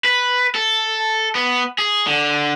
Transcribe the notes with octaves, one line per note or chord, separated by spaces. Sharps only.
B4
A4
B3
G#4
D3